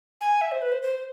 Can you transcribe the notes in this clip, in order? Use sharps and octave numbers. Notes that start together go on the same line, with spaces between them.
G#5
E5
C5
B4
C5
C5